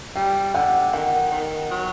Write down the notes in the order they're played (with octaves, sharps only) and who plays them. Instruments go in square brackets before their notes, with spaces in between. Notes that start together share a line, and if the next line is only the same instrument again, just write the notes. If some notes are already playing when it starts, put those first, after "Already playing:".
[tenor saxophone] G3 [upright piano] G5
[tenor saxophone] D3 [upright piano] F#5
[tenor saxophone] D#3 [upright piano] F#5
[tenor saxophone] D#3
F#3